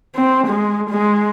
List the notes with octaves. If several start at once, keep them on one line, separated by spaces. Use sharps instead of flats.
C4
G#3
G#3